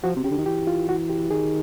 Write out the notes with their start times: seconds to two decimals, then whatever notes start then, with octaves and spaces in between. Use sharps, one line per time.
0.03 F3 F#4
0.16 C3
0.23 C#3 G4
0.31 D3
0.38 D#3
0.46 E3 G4
0.67 F4
0.89 F#4
1.09 G4
1.31 D#3 G#4